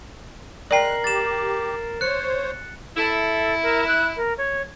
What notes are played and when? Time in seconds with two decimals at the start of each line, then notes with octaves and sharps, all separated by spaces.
0.71 G#3 A#4 D5 G5 F#6 C7 F#7
1.04 G4 A6 E7
2.01 C5 C#5 F#6 C#7
2.97 E4 A4
3.63 A#4
3.87 F#6
4.16 A#4
4.38 C#5